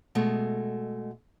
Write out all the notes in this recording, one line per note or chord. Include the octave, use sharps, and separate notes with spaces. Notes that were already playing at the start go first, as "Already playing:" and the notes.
B2 G#3 A3